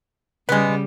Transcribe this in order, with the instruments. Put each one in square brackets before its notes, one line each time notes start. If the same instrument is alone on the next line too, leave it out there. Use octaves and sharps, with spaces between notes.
[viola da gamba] C#3 G3 [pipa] G#3 B3